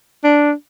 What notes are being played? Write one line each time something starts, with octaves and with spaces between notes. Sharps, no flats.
D4